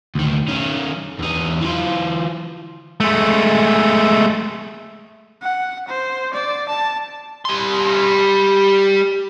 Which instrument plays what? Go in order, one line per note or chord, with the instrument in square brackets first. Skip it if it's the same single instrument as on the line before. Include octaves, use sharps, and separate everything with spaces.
[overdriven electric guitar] D2 D#3
D#3 C#4
E2 D#4
E3 F4
[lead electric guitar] G#3 A3
[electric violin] F#5
C5
D5
A5
[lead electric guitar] G3 C6